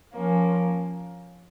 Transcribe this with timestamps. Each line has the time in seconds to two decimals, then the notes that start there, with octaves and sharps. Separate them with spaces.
0.13 F3 A#3 C#4